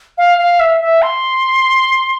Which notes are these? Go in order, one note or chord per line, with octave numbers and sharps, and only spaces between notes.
F5
F5
E5
E5
C6